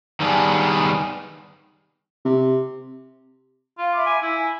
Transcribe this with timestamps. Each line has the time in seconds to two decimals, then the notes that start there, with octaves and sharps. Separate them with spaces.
0.20 D#3 G3 B3 D4 G#4
2.25 C3
3.78 F4 F5
3.93 E5 B5 D6
4.06 G#5
4.22 E4 G#5